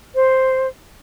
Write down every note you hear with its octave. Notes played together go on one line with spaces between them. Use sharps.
C5